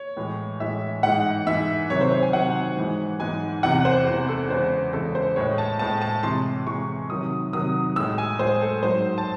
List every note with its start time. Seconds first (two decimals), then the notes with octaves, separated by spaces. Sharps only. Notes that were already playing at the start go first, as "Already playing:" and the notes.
Already playing: C#5
0.17 A2 E3 G#3
0.60 A2 E3 G#3 E5
1.03 G#2 E3 G#3 F#5
1.47 G#2 E3 G#3 E5
1.90 C3 D#3 F#3 C#5
2.01 C5
2.12 C5
2.22 G#5
2.33 C3 D#3 F#3 F#5
2.77 G#2 E3 G#3
3.20 G#2 E3 G#3 G#5
3.63 E2 C3 E3 F#5
3.85 C5
4.06 E2 C3 E3
4.28 A4
4.50 E2 C#3 E3 G#3 C5
4.93 E2 C#3 E3 G#3 A4
5.15 C5
5.36 A2 G#3 C#5
5.58 A5
5.79 A2 G#3 A5
6.02 A5
6.23 C3 E3 G#3 C6
6.66 C3 E3 G#3 C#6
7.10 C3 D#3 F#3 D#6
7.53 C3 D#3 F#3 D#6
7.96 A2 G#3 E6
8.18 G#5
8.39 A2 G#3 C5
8.61 A4
8.83 G#2 F#3 C5
9.18 A5